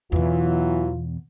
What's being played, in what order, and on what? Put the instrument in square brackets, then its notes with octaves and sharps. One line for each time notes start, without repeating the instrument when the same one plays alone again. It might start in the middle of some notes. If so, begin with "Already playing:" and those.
[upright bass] E2 B2 [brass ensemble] E3 F#3 [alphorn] F4